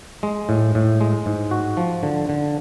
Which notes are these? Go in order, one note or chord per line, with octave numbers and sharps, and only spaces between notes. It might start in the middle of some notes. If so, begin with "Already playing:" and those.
G#3
A2
A2
G#3
G#2
F#4
F3
D3
D3